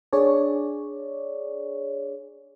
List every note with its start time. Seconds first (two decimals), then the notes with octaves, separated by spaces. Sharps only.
0.13 D4 G#4 C#5 D5